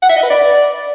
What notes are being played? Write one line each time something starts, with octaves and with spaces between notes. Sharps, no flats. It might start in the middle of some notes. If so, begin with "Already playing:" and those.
F#5
E5
D#5
B4
D5